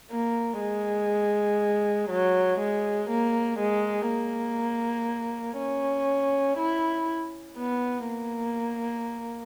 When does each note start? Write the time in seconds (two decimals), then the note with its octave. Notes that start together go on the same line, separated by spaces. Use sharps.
0.11 A#3
0.60 G#3
2.10 F#3
2.60 G#3
3.10 A#3
3.59 G#3
4.09 A#3
5.59 C#4
6.58 E4
7.58 B3
8.07 A#3